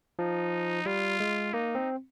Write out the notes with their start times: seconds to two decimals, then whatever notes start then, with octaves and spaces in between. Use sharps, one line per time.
0.19 F3 D#4
0.86 G3 F4
1.20 G#3
1.54 A#3 D#4
1.75 C4